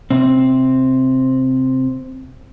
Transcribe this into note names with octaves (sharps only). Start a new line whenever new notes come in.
C3 C4